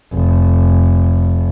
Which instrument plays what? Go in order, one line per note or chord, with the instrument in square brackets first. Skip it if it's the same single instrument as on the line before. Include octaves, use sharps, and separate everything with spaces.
[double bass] F1